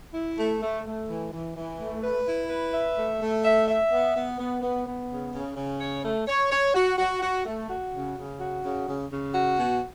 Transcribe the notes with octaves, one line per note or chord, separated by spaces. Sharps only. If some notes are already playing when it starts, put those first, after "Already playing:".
E4
A3
A3
A3
E3
E3
E3
A3
B4
E4
B4
E5
A3
A3
E5
E5
B3
B3
B3
B3
B3
C#3
C#3
C#3
C#5
A3
C#5
C#5
F#4
F#4
F#4
A3
F#4
C#3
C#3
F#4
C#3
C#3
C#3
F#4
B2